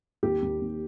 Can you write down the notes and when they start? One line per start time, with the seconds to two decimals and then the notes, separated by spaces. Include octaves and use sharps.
0.23 D#2 G4
0.42 D#2
0.61 D#2